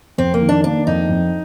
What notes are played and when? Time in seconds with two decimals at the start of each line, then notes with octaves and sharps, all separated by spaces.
0.18 F2 C4
0.34 A#3
0.41 D#3
0.49 D4
0.64 A#3 D4
0.87 F2 D#4
1.09 F2